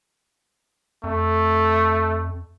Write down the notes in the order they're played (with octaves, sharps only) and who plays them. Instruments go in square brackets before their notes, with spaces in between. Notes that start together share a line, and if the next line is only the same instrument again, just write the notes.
[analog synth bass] F2 [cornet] A3